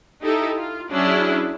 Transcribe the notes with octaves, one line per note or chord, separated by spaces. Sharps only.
D#4 E4 G4 A4
F4
F#3 C#4 D4 E4 G#4